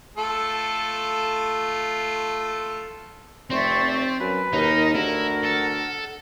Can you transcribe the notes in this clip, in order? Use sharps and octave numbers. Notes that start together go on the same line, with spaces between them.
A3 F4 A4
F1 C4 C5 D5 E5 C#6
F#2 B4 G#5
D#2 D#4 A#4 D#5
D2 E4 A#4 F#5
A4